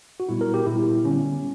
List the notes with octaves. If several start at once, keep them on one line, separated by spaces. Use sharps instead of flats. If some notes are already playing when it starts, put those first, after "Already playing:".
F#4
A#2 G3 B3 E4
A#4
G4
A#2 G3 B3 E4
D3 G3 B3 C#4